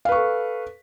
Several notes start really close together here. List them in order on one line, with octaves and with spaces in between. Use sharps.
F5 B4 C#6 A4